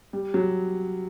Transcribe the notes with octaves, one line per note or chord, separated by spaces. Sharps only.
G3
F#3